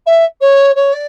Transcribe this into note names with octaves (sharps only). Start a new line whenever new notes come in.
E5
C#5
C#5
D5